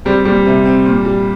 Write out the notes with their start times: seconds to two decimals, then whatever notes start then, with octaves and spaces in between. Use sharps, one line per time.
0.05 G3 C4
0.25 A#2 G3
0.46 C3
0.65 C4
0.86 A#2
1.05 G3